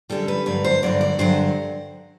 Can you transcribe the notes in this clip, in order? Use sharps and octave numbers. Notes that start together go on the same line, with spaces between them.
F#2 D3 G3 A4
B4
G2 D3 F#3 B4
C5
G2 D3 F#3 D5
D5
G2 D3 F#3 C5